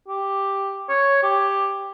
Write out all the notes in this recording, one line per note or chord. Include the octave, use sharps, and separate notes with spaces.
G4
C#5
G4